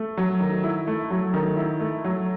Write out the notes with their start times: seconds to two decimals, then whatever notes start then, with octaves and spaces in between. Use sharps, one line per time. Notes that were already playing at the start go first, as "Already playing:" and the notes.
Already playing: A3
0.17 F#3
0.40 D#3
0.64 E4
0.87 A3
1.11 F#3
1.34 D#3
1.57 E4
1.80 A3
2.04 F#3